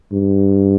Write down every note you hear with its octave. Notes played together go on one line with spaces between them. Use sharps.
G2